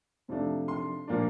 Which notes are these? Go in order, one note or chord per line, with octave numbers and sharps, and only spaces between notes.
F2 C3 F3 A3 D4
C6
A#2 F3 A#3 D4